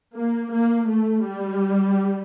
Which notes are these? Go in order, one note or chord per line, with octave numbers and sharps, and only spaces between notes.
A#3
A#3
A3
G3